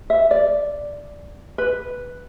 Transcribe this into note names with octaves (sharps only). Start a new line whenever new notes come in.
E5
D5
B4